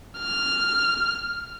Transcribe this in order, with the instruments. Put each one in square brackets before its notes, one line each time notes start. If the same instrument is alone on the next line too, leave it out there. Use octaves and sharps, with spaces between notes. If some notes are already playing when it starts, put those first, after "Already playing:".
[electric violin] F6